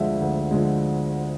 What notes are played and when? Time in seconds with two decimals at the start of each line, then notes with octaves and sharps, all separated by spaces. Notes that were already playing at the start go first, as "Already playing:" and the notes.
Already playing: D2 D3 F3 G#3 E5
0.21 D2
0.51 D3 F3 G#3